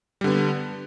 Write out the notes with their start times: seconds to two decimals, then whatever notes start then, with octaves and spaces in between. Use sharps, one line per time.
0.21 G3
0.24 D3
0.27 B3